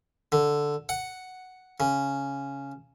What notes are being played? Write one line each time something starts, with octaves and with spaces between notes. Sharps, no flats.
D3
F#5
C#3